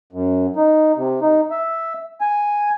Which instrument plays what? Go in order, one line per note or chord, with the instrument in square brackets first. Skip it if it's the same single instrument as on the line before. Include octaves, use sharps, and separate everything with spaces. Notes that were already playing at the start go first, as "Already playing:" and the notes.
[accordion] F#2
D#4
C3
D#4
E5
G#5